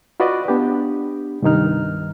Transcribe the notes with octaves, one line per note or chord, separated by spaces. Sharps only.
F4 F#4 B4 D5 D#5
B3 D4 G4
C2 G2 D#3 D#4 F6